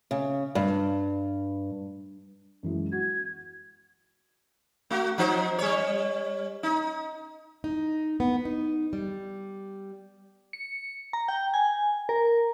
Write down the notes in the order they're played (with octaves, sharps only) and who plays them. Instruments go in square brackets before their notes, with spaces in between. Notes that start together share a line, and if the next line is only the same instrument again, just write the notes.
[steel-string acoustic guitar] C#3
G2
[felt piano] F#2 E3 G#3
[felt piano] F#4 [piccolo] G#6
[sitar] A3 F#4
F3 D#4 C5
G3 C#5
D#4
[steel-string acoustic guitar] D#4
B3
D#4
G3
[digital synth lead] C#7
A#5
G5
G#5
A#4